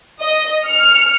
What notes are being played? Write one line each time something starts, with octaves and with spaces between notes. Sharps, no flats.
D#5
F6 C#7